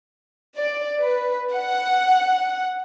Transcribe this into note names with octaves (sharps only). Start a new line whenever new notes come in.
D5
B4
F#5